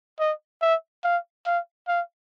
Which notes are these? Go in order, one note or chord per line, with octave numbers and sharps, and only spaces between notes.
D#5
E5
F5
F5
F5